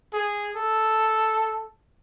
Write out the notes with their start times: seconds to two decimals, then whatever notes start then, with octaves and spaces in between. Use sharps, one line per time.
0.14 G#4
0.56 A4